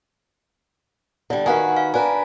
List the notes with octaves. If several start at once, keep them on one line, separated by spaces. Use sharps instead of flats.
D3 G3
D#3 F#4 B4 F5 F#5 G#5
F5
D4 B4 G#5 A#5